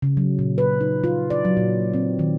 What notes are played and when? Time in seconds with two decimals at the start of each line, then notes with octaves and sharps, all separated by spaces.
0.02 C#3
0.17 F#3
0.39 A#2
0.58 B4
0.81 D#4
1.04 F4
1.30 D5
1.45 F#3
1.57 A#2
1.94 C4
2.19 D#3